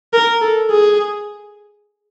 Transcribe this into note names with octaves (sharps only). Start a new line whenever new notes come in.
A#4
A4
G#4